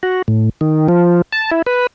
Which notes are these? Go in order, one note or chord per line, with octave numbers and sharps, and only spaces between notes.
F#4
A2
D#3
F3
A5
E4
B4